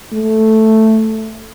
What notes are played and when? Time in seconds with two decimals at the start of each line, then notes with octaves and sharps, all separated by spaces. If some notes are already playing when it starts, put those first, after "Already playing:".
0.13 A3